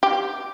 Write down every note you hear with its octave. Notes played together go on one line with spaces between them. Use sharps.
G4